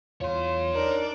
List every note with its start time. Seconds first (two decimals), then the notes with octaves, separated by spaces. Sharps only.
0.21 E2 F4 C#5 C6
0.75 D4 D#4 A#4 D5